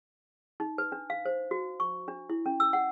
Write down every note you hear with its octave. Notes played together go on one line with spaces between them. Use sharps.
D#4
B4
D4
F5
C5
F#4
C#6
D4
E4
C#4
E6
F#5